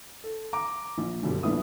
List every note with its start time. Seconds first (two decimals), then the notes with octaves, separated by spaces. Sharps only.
0.24 A4
0.53 A#5 D6
0.98 A#1
1.23 G1 F#2 B2 G3
1.43 D#1 A#1 B3 D4 E4 D#6